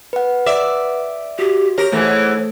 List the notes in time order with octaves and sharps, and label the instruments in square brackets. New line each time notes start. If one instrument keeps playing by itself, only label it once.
[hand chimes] B4 F#5
[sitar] D5 E5
[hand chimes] F#4 [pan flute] G4
[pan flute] G4 [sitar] A#4 [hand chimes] C#5
[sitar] G#2 E3 [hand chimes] A3 A4 [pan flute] C#5